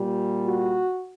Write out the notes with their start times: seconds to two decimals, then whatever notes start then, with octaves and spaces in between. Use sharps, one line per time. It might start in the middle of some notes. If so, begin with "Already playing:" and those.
Already playing: A#2 G3
0.45 F#4